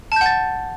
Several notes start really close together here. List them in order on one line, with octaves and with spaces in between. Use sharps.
A5 G6 F#5 A6